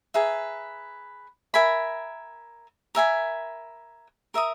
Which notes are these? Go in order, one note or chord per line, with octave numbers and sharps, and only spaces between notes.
G#4 B4 E5 A#5
A#4 E5 G#5 B5
A#4 E5 G#5 B5
A#4 E5 A#5 D#6